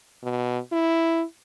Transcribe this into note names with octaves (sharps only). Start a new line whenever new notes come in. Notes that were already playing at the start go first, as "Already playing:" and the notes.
B2
E4